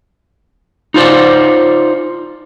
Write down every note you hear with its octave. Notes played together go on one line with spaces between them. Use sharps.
D#4 F4 C5 D5